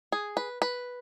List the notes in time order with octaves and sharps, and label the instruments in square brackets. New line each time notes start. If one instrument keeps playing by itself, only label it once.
[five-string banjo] G#4
B4
B4